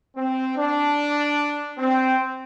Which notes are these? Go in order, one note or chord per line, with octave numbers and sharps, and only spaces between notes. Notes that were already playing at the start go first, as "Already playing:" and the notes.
C4
D4
C4